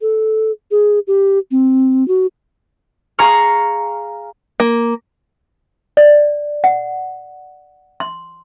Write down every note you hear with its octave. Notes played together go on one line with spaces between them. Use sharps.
A4
G#4
G4
C4
F#4
G#4 F5 A#5 C#6 F6
A#3
D5
F#5
C6